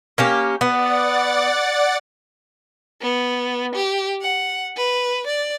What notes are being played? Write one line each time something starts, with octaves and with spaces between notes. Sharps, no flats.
A#3 C#4 G4
B3 D5 F#5 A6
B3
G4
F#5
B4
D5